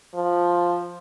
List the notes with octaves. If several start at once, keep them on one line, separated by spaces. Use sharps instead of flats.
F3